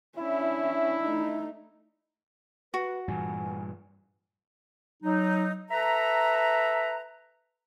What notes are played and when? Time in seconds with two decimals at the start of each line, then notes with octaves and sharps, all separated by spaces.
0.18 C#4 D4 E4
1.04 A3 D#4
2.74 F#4 B4
3.08 G2 A#2 E3 G#5
5.03 F#3 D#4
5.70 A4 B4 E5 A#5